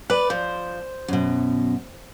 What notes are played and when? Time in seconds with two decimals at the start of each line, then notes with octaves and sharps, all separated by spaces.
0.10 B4 D5
0.30 F3 C5
1.08 F#2 B2